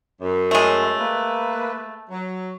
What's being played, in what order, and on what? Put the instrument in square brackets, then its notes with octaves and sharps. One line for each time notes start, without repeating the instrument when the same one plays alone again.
[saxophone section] F#2
[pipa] G#3 A3
[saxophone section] A#3 B4
F#3